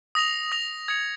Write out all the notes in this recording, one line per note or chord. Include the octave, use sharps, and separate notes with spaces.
D#6 A#6 F7
D#6 A#6 F7
D#6 G#6 C#7 F7